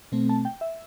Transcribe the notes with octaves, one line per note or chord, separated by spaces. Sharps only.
B2 A3 C4
A5
G5
E5